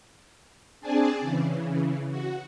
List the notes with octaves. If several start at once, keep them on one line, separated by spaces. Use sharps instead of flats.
C4 D4 G#4 D5 G#5 A5
C#3 E3
F#4